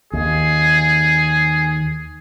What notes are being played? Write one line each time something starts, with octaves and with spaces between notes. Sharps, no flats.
D#2 G#4